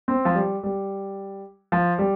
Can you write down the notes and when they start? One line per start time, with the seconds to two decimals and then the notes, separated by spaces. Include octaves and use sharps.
0.08 C4
0.25 F3
0.35 G3
0.63 G3
1.72 F3
1.99 G3